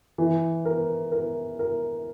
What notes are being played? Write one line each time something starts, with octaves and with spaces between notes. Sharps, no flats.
E3
A#4
A#4
A#4